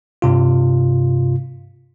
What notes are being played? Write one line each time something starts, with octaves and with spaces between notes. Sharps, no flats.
G2 C3 F4